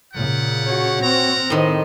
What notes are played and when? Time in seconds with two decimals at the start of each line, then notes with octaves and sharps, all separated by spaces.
0.13 A#2 C#3 F4 G4 F#5
0.66 F#4 C#5
1.03 C4 A#4 F#5 A#5
1.50 A2 D#3 C5 D#5